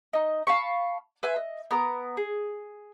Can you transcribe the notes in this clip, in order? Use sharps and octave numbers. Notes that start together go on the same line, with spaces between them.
D#4 D#5
F5 A5 B5 C#6
B4 E5 G#5 C6
D#5
B3 A#4 D#6
G#4